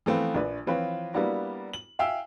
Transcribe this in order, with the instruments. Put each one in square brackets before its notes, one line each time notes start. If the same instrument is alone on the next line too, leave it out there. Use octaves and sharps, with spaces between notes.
[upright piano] E3 F3 A3 B3 C4 F4
A#1 D4 B4
E3 F3 C4 F4 B4 C#5
G3 A#3 B3 D4 E4 F#4
F#7
E5 F5 G5 G#5 E6